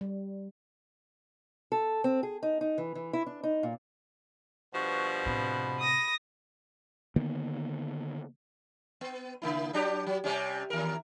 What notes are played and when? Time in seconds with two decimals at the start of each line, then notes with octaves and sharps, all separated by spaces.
0.01 G3
1.72 A4
2.04 C4
2.23 G#4
2.43 D#4
2.61 D#4
2.78 E3
2.95 E3
3.13 E4
3.27 D4
3.43 D#4
3.63 A#2
4.74 G2 B2 F3 C#6
5.26 A2 C3 B5
5.80 D#6 A#6
7.16 D3 D#3 A#3 B3
9.01 B3
9.42 C#3 A#3 E4
9.73 F#3 D4 G4
10.07 F#3
10.24 C3 G3 C#4
10.70 D#2 A#4